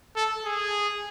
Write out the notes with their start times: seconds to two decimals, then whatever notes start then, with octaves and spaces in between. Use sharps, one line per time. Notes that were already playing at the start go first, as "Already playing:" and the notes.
0.16 A4
0.45 G#4